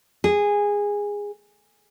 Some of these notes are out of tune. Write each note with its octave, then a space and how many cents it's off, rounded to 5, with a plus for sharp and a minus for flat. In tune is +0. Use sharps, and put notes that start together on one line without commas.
G#4 -15